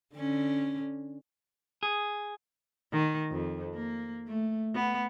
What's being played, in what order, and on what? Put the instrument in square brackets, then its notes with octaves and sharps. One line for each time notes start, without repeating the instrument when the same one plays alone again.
[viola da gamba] D3 C#4
[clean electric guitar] G#4
[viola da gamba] D#3
F2
A#3
A3
B3